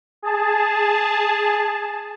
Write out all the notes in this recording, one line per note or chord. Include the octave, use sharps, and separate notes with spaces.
G#4 A5